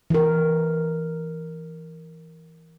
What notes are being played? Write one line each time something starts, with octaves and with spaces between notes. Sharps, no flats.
E3 A#4